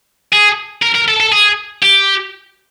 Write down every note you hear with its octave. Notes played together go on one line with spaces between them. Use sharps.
G#4
A#4
A#4
A4
A4
G#4
G4